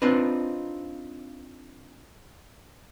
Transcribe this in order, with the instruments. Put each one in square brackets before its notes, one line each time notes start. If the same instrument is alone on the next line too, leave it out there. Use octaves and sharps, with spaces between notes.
[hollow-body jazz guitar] C4 D4 D#4 F4 B4